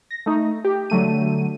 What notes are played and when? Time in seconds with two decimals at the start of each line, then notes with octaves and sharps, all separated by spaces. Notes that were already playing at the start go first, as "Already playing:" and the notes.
0.11 A#6
0.26 A3 D#4
0.64 G4
0.90 D3 F#3 A3 D#7